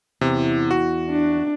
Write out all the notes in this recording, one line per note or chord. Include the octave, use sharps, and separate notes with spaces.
E2 C3
F#4
D4